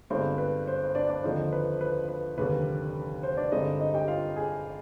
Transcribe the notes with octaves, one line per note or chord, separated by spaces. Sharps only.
G1 G2 D3 G#3 C4 C5
B4
C5
C5
D4 D5
D4 D5
D#2 D3 F3 C4 D#4 C5
B4
B4
B4
F1 D#2 D3 G3 B4
C5
D4 D5
G2 D3 G#3 C4 D#4 D#5
D#4 D#5
G4 G5
F4 F5
G#4 G#5